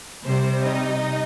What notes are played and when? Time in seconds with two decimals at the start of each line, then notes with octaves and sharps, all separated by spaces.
0.25 C3 G3 C5
0.63 D#4 D#5